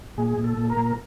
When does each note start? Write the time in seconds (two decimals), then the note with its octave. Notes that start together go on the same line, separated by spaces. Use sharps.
0.18 A#2 G#4
0.38 A#2
0.44 A4
0.57 A#2
0.70 A#4
0.77 A#2